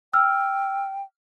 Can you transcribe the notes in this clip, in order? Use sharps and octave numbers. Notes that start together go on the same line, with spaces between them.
G5 E6 F6